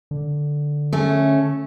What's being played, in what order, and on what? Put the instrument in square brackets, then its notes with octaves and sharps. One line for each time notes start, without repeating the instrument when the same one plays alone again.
[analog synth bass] D3
[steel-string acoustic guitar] A3 C#4